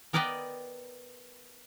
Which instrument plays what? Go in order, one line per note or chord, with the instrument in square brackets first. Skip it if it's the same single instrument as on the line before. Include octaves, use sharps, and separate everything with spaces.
[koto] B3 A#4 B4 D5 D#5 G5